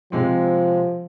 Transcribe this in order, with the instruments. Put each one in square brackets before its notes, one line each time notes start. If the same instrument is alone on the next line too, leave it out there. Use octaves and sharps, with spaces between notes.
[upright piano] C3 G#3 C4 [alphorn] F3